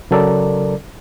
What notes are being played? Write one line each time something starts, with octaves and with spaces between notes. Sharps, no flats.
C#3 F#3 A4 A#4 D5